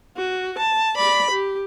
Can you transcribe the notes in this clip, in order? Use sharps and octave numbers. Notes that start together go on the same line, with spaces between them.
F#4
A5
D5 B5
G4